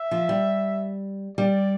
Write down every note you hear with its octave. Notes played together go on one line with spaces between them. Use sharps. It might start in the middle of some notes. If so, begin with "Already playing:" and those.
Already playing: E5
F3
G3
G3 D5